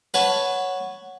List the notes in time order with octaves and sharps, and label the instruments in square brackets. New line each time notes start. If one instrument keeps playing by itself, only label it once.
[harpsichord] B4 C#5 A5 [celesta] F#5